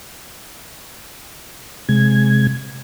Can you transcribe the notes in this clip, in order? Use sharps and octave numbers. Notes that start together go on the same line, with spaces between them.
C3 G#3 G#6